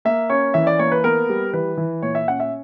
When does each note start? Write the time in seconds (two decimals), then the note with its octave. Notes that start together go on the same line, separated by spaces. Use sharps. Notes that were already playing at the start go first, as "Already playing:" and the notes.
0.05 A#3 E5
0.30 C#4 C#5
0.54 E3 E5
0.67 D5
0.79 A#3 C#5
0.92 B4
1.04 B3 A#4
1.29 G3
1.53 E3 B4
1.77 E3
2.02 A#2 C#5
2.15 E5
2.28 C#4 F#5
2.40 E5